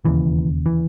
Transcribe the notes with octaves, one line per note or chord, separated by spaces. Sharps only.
E1 D#2 C#3 E3
E3